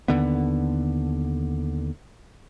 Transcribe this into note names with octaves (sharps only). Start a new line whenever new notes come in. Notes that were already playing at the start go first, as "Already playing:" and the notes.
D#2 D3 B3